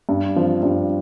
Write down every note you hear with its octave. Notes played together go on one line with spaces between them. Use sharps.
G2
F3 C4
G2